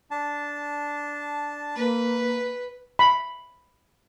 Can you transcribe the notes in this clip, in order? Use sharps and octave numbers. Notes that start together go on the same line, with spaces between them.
D4 A5
A#3 B4
B5